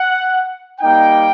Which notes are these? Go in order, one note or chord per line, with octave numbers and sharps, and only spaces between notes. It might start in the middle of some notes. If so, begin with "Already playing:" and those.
Already playing: F#5
G3 A#3 D#4 G5